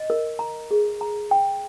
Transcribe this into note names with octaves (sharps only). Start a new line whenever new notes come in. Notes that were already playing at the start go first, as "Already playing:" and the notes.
Already playing: D#5
A#4
A#5
G#4
A#5
G5